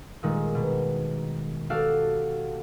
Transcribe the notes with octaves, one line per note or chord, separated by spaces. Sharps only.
A#2 D#3 G3 G#3
B2
F#4 G4 A4 D5 F5 F#5